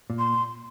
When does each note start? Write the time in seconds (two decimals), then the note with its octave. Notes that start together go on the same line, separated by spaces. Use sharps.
0.10 A#2
0.18 C6